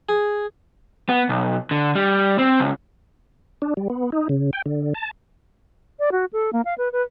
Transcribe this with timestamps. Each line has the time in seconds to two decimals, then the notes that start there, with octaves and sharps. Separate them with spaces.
0.09 G#4
1.09 B3
1.29 B1
1.71 D3
1.95 G3
2.39 C4
2.60 C#2
3.62 D4
3.77 G3
3.90 B3
4.12 D#4
4.29 C#3
4.53 G5
4.66 D3
4.94 A5
5.99 D5
6.12 F#4
6.33 A4
6.53 A#3
6.65 F5
6.78 B4
6.92 B4